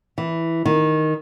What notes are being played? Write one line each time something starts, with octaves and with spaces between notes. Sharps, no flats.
E3
D#3